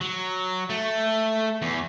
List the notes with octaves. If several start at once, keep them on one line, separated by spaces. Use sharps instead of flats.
F#3
A3
E2